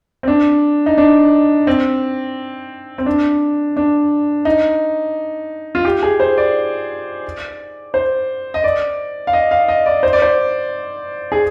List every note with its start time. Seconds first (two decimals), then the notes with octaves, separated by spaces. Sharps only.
0.23 C4
0.28 D4
0.86 D#4
0.98 D4
1.67 C4
2.98 C4
3.06 D4
3.77 D4
4.45 D#4
5.75 F4
5.85 G4
6.03 G#4
6.20 C5
6.38 D5
7.94 C5
8.54 D#5
8.64 D5
9.27 F5
9.33 D#5
9.51 F5
9.68 D#5
9.86 D5
10.03 C5
10.13 D5
10.22 C5
11.32 G#4